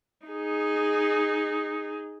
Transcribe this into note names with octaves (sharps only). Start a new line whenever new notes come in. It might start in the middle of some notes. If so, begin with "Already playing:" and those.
D#4 G#4